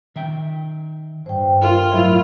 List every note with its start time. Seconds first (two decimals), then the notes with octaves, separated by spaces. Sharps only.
0.16 D#3 E5 G5
1.26 G2 C5 G5
1.62 F4 A4 A#4
1.92 A2 F#3 E4 C#5